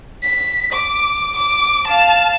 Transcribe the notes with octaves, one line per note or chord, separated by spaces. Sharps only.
B6
D6
D6
F5 A5